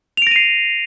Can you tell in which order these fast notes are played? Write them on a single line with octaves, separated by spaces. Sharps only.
F7 D7 A#6 D#7 C7